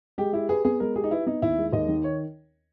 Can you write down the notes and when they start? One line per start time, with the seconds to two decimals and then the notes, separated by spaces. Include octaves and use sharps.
0.18 G#3 G4
0.33 E4 G4
0.49 G#4 B4
0.65 B3 G#4
0.80 G#3 A#4
0.96 G4 G#4
1.04 D#4
1.11 E4 B4
1.26 B3 D#4
1.42 D#2 E4
1.58 G#3
1.73 D#2 D#5
1.88 D#3
2.04 C#5